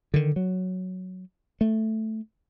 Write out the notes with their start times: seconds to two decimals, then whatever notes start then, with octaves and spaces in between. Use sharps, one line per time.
0.14 D3 D#3
0.36 F#3
1.61 A3